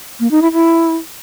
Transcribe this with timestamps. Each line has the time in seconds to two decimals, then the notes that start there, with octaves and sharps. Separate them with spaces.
0.20 A#3
0.31 D#4
0.42 E4
0.53 E4